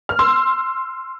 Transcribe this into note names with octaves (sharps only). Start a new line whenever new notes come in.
F6
C6 E6